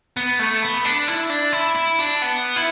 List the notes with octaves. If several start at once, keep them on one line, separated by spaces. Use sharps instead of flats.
B3
A3
B3
D4
E4
D4
E4
E4
D4
B3
E4